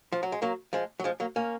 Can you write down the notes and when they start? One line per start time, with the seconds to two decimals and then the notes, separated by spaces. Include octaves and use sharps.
0.12 F3
0.23 F#3
0.32 G#3
0.42 F#3 A#3
0.73 F3 G#3
1.00 F#3
1.04 F3 G#3
1.20 F#3 A#3
1.36 A#3 C#4